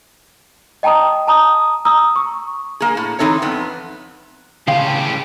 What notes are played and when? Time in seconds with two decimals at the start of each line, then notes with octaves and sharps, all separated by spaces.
0.83 D#5 G5 A5 A#5 D#6
1.28 A5 A#5 D#6
1.85 A#5 D#6 E6
2.16 C#6
2.80 A#3 G#4
2.97 A2
3.19 E3 C4 D#4 A4 C#5
3.42 F2 B3
4.67 A2 C#3 G4 F5 C6